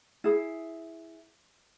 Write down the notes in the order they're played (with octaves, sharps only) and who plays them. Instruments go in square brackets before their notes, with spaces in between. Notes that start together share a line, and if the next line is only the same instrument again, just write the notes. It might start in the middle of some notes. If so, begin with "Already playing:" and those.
[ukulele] E4 G#4